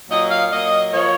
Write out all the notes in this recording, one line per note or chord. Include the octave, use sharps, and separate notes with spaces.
A#2 F#3 A#3 D#5
F5
A#2 F#3 A#3 D#5
F3 A#3 C#5